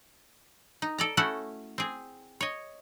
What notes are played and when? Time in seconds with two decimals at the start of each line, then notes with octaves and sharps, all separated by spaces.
0.82 D#4
0.98 A4 D5 A#5
1.17 A3 C#4 E4 F#4 A4 F#5
1.78 C4 G#4
2.41 C#5 D#5